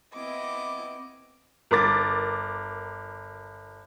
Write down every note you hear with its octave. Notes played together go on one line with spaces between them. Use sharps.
B3 C4 E4 D#5 D6
G1 A#4 D6 A6